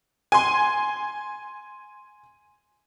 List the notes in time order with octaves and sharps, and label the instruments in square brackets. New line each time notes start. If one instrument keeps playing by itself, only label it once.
[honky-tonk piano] G#5 C6